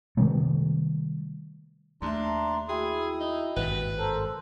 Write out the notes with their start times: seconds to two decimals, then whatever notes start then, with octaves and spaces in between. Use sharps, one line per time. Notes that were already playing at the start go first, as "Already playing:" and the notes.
0.17 C3 D#3 G3 A3
2.02 D#2 A3 D4 E5 A#5 C6
2.69 E4 F#4 G#4 G5 B5
3.20 D#4
3.56 G#1 G2 A#2 B4
3.98 A4 A#4 C5